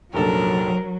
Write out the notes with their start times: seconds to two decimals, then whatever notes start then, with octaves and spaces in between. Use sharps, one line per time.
0.14 F1 A#1 F#3 A4 A#4